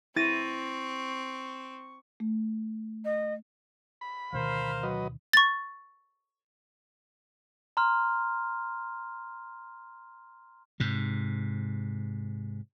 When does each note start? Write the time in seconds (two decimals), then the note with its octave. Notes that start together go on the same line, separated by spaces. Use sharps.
0.16 C4 E4 C#6 A6 A#6 D#7
2.20 A3
3.05 D#5
4.01 B5
4.33 D2 B2 D#3 A#4 C5 F5
4.83 F#3 B4 D#5
5.33 C#6 A6
7.77 A#5 C6 F6
10.80 G#2 C3